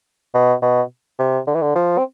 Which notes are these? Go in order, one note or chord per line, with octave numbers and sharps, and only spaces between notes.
B2
B2
C3
D3
E3
D3
F3
C4